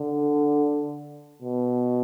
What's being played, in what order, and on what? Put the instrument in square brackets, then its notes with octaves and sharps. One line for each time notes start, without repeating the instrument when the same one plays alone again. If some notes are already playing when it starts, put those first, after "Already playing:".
Already playing: [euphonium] D3
B2